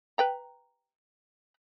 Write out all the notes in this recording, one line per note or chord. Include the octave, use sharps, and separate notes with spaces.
B4 G5 A#5